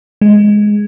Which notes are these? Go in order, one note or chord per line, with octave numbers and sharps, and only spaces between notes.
G#3